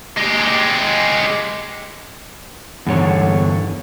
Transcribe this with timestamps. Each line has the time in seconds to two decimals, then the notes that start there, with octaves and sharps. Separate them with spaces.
0.17 G#3 G4
2.87 E2 G2 D3 C#5